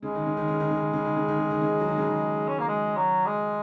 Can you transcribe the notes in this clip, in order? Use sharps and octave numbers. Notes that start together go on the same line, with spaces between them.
C#3 G#3
D#3
C#3
D#3
C#3
D#3
C#3
D#3
C#3
D#3
C#3
D#3
C#3
D#3
C#3
F#3
D#3
C#3
D#3
C#4
A#3
G#3
F#3
G#3